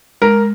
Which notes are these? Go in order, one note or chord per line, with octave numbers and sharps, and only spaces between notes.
G#3 A#4